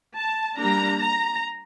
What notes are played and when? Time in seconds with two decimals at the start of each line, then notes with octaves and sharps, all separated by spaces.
0.16 A5
0.57 G3 A#3 D4 A#5
0.99 A#5